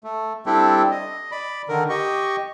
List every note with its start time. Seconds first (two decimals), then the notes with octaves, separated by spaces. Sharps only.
0.04 A3
0.46 G3 C4 D4 E4 G4 A4
0.91 D#5
1.31 D5 B5
1.69 D3 D#3 A#4
1.89 G4 D#5 C#6